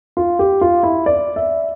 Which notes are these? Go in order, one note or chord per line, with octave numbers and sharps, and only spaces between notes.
F4
G4
F4
E4
D5
E5